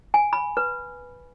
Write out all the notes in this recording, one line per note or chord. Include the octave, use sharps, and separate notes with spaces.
G#5
B5
B4